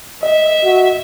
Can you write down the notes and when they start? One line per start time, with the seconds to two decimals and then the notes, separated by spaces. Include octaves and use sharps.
0.23 D#5 E5
0.64 F#4